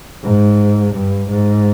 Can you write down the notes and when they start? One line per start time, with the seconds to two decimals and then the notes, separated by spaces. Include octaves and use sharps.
0.23 G#2
0.95 G2
1.31 G#2